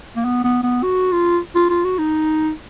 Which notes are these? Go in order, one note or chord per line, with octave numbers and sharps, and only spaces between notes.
A#3
B3
B3
B3
F#4
F4
F4
F4
F#4
D#4